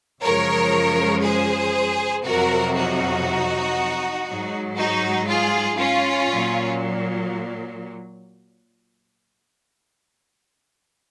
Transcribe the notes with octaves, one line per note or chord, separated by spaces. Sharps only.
F#2 C#3 F3 G#3 A#4 C#5
G#4 C5
F2 C3 F#3 F#4 A#4
D#4 F#4
G#2 F#3
D#4 F#4
F4 G#4
C#4 F4
A#2 F#3